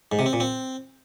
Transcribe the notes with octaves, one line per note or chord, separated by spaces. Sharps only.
G#2
C3
C4
A#2
C4